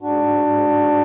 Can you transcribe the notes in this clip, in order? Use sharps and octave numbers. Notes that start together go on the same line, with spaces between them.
G#2 D4 F#4
G#2
G#2
G#2